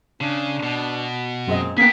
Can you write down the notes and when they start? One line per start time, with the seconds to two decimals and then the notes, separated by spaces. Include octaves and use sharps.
0.21 C#3 D4
0.63 B2
1.47 F#2 A#2 G#3 C4 D#5
1.78 A#3 B3 G#4 G5 B6